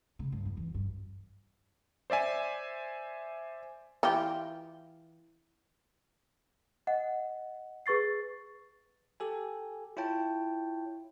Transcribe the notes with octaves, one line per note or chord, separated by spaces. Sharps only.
C#3
G2
E2
E3
G2
C5 D5 E5 G#5
E3 F4 G4
D#5 F#5
G#4 B4 C#6 A6 C7
G4 A4 G#5
E4 F4 C#5 G5 A5